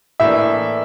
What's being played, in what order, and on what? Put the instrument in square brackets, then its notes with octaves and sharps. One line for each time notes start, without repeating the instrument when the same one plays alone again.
[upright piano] A2 E3 A#3 D4 E5